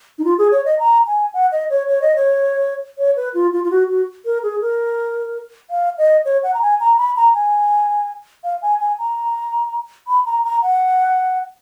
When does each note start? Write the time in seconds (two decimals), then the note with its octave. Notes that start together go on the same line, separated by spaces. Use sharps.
0.19 D#4
0.24 F4
0.38 G#4
0.52 C#5
0.65 D#5
0.79 A#5
1.07 G#5
1.34 F#5
1.52 D#5
1.70 C#5
1.88 C#5
2.02 D#5
2.16 C#5
2.98 C#5
3.16 B4
3.34 F4
3.53 F4
3.64 F4
3.71 F#4
3.89 F#4
4.25 A#4
4.43 G#4
4.61 A#4
5.70 F5
5.98 D#5
6.25 C#5
6.43 F#5
6.54 A#5
6.62 G#5
6.80 A#5
6.98 B5
7.16 A#5
7.34 G#5
8.44 F5
8.62 G#5
8.80 G#5
8.99 A#5
10.08 B5
10.26 A#5
10.44 A#5
10.62 F#5